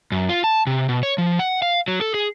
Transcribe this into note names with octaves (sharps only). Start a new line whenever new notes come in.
F#2
F4
A5
C3
B2
C#5
F3
F#5
F5
F#3
A4
G#4